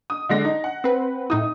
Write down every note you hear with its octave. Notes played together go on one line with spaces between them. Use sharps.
D#6
D3 G#3 A#6
D#4
F#5
C4 B4
A2 D#4 E4 D#6